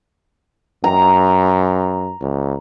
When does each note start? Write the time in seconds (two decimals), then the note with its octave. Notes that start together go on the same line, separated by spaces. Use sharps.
0.84 F#2 A#5
2.21 C#2